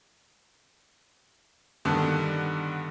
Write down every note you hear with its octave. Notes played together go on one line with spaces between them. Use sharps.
G2 D3 D#3 B3 A5